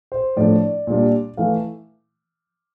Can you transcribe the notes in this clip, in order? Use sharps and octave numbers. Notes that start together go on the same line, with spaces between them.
C5
A2 F3 A3 D4 D5
A#2 G3 D4
E3 A3 F5